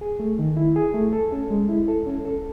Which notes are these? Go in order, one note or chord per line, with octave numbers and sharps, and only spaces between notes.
G#4
A3
D#3
E4
G#4
A3
A4
C#4
G#3
E4
A4
C#4
A4